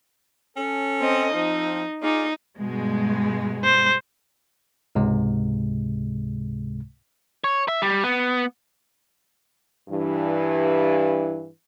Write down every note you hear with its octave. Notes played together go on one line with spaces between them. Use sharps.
C#4 A4
C4 D#5
F3 C4 D#4
D#4 F4 G#4 D5
G2 B2 G#3
C5
C#2 G#2 C3 G#3
C#5
E5
G3
B3
G2 E3